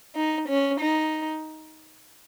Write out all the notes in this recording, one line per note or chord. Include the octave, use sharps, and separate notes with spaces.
D#4
C#4
D#4